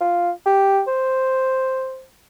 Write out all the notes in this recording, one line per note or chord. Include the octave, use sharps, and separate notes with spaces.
F4
G4
C5